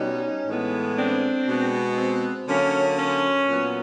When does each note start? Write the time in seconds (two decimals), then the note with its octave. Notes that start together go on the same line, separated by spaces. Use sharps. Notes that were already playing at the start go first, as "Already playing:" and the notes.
Already playing: B2 G3 B3 C#4 D#4
0.47 A2 E3 G#3 B3
0.97 C4 D4
1.48 B2 G#3 B3
1.98 C4
2.48 D3 F#3 A#3 C#4
2.97 C#4
3.48 A#2 F#3 B3